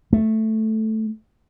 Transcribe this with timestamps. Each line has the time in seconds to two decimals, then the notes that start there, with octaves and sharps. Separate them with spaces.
0.13 A3